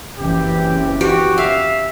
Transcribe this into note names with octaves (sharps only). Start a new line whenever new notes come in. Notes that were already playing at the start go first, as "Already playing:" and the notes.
F#1 E3 C4 G4
F#4 G4
E5 F5